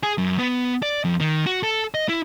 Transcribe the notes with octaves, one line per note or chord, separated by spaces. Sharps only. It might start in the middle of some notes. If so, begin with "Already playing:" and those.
G#4
F#2
B3
D5
F2
D#3
F#4
A4
D#5
E4